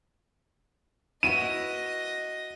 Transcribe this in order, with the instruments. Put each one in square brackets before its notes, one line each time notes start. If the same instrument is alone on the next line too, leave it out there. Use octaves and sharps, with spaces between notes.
[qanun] E4 F#4 B4 [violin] D#5 A#6 [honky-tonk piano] D#7